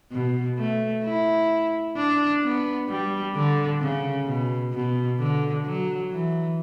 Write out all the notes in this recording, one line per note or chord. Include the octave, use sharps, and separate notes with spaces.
B2
A3
E4
D4
B3
G3
D3
C#3
B2
B2
D3
F#3
E3